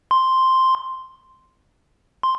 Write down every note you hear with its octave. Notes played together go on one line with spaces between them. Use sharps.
C6
C6